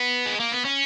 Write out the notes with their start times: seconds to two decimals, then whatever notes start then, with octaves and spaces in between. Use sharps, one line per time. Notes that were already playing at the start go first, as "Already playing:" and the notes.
Already playing: B3
0.26 G#3
0.40 A#3
0.52 B3
0.65 C#4